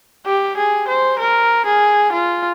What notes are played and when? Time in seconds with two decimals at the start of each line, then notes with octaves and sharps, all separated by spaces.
0.25 G4
0.57 G#4
0.88 C5
1.19 A#4
1.66 G#4
2.12 F4